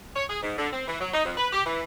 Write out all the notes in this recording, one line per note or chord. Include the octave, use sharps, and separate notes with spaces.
C#5
G#4
G#2
D3
C4
E3
F#3
D#4
F2
B4
G4
E3